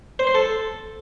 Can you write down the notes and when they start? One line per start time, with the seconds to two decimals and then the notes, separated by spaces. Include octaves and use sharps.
0.19 C5
0.27 C6
0.35 A4